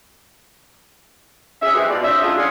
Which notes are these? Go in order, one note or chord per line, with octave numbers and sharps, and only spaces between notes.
C#4 G#4 E5
E3 G3 G#3 C4 E4 F#4
B2 F4 D5
C#4 D#4 C5 E5
A2 D4 F4 G#4
F#3 C#4 D4 F4 G#4